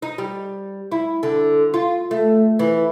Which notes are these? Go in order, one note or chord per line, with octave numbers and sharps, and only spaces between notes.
D#4
G3
E4
D3
F4
A3
E3